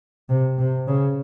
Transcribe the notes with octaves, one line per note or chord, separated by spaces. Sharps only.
C3
C3
C#3